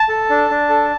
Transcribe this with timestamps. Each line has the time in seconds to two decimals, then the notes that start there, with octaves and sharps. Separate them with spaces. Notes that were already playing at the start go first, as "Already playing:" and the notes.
Already playing: A5
0.09 A4
0.30 D4
0.50 D4
0.69 A4